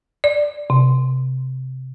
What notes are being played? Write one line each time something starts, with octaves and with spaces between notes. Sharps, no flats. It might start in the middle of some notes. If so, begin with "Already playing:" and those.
D5
C3